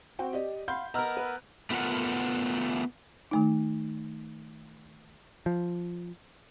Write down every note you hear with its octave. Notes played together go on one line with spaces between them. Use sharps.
C4 F#4 G5
G4 D5 D#5
F5 F#5 B5 C6 G6
B3 A#4 D#5 A#5 E6 F6
B4
A3 B3 F4 G4 A#4 F#5
D#3 A3 D#4
F3